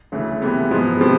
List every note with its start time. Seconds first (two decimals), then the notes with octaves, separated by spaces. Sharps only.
0.12 D2 C#3 E3 A3
0.42 C3 E3 G#3 B3
0.71 G#2 F3 G#3 B3
1.00 C3 F3 G#3 B3